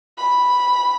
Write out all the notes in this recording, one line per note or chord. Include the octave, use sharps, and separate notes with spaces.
B5